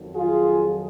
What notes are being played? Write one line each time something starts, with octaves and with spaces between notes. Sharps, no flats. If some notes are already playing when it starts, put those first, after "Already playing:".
Already playing: F2 D#3 F#3
F4 G#4